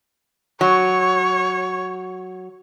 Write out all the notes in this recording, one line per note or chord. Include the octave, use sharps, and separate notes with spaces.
F#3 C#5